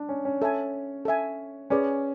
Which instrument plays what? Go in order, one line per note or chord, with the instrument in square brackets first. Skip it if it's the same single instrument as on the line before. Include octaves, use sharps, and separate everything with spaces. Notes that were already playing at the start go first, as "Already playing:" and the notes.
Already playing: [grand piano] D4
C#4
C#4
[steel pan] A4 E5 G#5
A4 E5 G#5
[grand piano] C#4 [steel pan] G#4 B4 D5